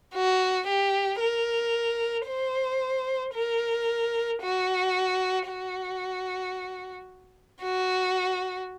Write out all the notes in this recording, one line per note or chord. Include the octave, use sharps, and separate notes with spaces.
F#4
G4
A#4
C5
A#4
F#4
F#4
F#4